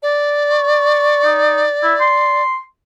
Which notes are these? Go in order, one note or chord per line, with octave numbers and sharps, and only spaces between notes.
D5
C#6
D#4
E4
C6